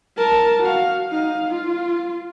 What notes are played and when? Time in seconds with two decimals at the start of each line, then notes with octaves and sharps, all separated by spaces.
0.17 A#4 A5
0.62 F#4 F5
1.09 D#4 F5
1.49 F4